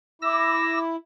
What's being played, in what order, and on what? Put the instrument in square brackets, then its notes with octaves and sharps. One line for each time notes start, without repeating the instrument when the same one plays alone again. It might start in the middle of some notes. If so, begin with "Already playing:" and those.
[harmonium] E4 [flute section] D6 [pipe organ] E6 A#6